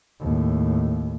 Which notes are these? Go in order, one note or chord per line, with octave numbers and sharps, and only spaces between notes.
D#2 A2